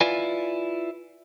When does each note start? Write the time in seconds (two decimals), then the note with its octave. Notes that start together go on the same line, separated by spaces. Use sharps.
0.01 E4 F4 B4 D5 G#5